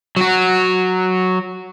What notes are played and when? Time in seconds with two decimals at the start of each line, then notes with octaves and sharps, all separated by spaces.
0.16 F#3 F#4